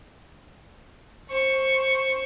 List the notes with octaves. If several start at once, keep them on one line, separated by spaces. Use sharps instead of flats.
C5 C#6